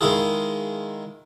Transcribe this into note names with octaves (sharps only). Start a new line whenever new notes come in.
D#3 G#3 E4 F4 G#4